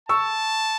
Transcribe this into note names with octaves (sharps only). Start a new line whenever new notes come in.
A5 C#6 E6